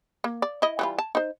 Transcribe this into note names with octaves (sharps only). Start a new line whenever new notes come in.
A#3
D5
E4 D#5
E3 G3 F4
A5
D#4 C5